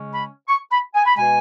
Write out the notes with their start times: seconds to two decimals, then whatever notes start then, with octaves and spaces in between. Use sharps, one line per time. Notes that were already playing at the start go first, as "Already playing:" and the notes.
Already playing: C#3 G#3 C#4
0.13 B5
0.48 C#6
0.70 B5
0.94 G#5
1.05 B5
1.16 B2 G#3 B3 G#5